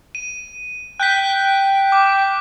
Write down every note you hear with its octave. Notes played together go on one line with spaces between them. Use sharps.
D#7
G5 F#6 G6 B6
D6